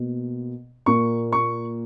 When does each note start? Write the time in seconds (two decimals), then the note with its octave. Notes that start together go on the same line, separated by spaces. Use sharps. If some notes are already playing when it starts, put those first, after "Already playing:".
Already playing: B2 A#3
0.86 A#2 A#3 C#6
1.32 C#6